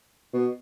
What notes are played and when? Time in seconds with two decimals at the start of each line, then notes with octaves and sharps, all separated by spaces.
0.34 B2